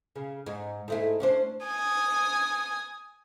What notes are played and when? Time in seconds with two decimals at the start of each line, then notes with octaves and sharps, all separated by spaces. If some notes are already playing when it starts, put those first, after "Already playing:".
0.16 C#3
0.46 G#2
0.88 G#2 A3 E4
1.20 C#4 D4 C5
1.65 G#5 D#6